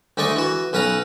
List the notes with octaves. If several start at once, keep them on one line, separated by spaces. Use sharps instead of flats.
D2 G#3 A3 D5 D#5 C#6
E3 F#4
B1 C#4 B4 F#5 A#5